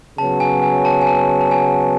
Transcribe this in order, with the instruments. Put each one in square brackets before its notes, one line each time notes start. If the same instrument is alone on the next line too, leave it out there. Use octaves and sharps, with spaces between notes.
[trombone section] C#3 F#3 B3 [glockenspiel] A5
[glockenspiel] G#5
G#5
A5
G#5
A5
A5
G#5